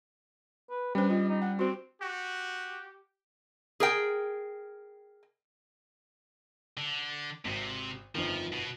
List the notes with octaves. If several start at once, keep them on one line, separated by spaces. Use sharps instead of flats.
B4
G3 C#4 D4 B4 C5
F4 D#5
D#4
F#5 G5
C4 F#4 C5
F#4 G4
G#4 A#4 G5
D3
G#1 C3
G1 F2 D#3 F3
B2